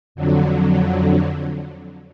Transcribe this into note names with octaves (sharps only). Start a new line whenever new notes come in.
F2 D3 F#3